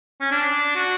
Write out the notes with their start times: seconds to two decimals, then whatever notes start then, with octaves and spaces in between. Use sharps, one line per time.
0.21 C#4
0.32 D4
0.76 F#4